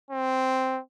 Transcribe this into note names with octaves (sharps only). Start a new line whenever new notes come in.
C4